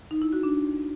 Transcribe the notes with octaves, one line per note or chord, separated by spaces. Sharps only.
D#4
E4
F#4
D4